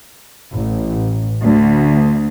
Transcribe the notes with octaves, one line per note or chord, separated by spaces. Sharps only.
A1
D2